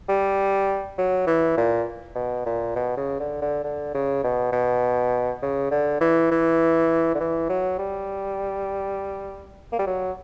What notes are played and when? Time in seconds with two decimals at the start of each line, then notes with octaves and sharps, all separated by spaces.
0.09 G3
0.98 F#3
1.27 E3
1.57 A#2
2.15 B2
2.46 A#2
2.76 B2
2.97 C#3
3.20 D3
3.42 D3
3.64 D3
3.94 C#3
4.24 B2
4.52 B2
5.42 C#3
5.71 D3
6.01 E3
6.31 E3
7.15 D3
7.20 E3
7.49 F#3
7.79 G3
9.72 A#3
9.79 G3
9.86 F#3